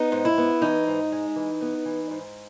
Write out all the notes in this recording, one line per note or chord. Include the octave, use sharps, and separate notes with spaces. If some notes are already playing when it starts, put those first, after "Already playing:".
Already playing: B3 D#4
G#2
E4
B3
E3 D#4
G#2
G#3
E3
B3
E3
G#2